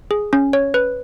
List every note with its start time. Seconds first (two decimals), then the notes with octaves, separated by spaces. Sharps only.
0.11 G#4
0.33 C#4
0.53 C#5
0.74 B4